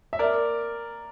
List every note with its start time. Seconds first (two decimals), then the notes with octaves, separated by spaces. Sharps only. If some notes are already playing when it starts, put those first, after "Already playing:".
0.13 E5
0.19 A#4 D5